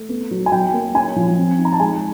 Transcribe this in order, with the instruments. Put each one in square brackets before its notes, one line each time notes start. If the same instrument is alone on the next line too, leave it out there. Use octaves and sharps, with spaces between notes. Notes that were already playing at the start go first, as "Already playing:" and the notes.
Already playing: [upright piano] A3
B3
F#3
G#5
F#3 G5
A#3
C#4 G#5
F3
C4
D#4
A#5
A5
G#3 G#5